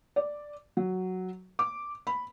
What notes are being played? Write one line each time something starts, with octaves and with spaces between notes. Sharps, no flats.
D5
F#3
D6
B5